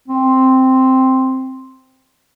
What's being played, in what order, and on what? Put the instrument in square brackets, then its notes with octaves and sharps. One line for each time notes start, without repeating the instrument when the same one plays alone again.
[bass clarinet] C4